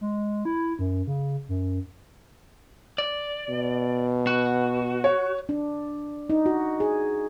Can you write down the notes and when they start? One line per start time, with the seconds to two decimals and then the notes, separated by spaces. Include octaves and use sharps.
0.01 G#3
0.45 E4
0.79 F#2
1.07 C#3
1.49 F#2
2.98 D5
3.49 B2
4.27 F#4
5.04 C#5
5.49 D4
6.30 D#4
6.46 F#4
6.80 G#4